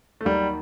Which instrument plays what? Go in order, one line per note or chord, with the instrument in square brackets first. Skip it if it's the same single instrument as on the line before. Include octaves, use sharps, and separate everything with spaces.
[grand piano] A3
D#2 D#3 F#3 G3